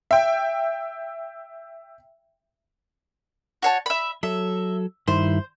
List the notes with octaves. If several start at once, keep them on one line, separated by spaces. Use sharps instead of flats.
E5 G5
F#4 C#5 A5
E5 B5
F#3 A4 E5
G2 D#3 E4 C5